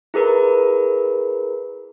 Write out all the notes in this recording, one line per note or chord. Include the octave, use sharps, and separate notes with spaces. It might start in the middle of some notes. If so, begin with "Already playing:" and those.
E4 G#4 A#4 B4